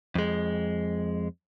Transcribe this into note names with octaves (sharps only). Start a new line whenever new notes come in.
F2 G#3